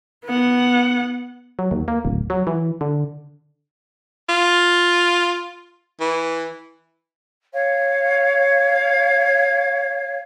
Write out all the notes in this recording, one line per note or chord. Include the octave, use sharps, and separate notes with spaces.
B3 F#5
F#3
D#2
A#3
D1
F#3
E3
D3
F4
E3
C#5 F5